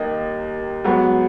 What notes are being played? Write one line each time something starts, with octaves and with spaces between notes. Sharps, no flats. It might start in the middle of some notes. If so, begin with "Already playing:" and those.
Already playing: D#2 D#3 A#3 D#5
G#2 F#3 B3